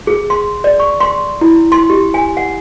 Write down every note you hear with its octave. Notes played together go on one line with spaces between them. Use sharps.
G#4
C6
D5
C#6
C6
E4
C6
G4
G#5
F#5